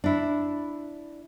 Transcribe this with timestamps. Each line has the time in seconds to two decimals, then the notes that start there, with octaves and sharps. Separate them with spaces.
0.04 D4 E4